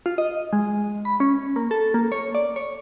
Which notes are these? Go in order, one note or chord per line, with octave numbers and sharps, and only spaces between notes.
F4
D#5
G#3
B5
C#4
A#3
A4
A#3
C#5
D5
C#5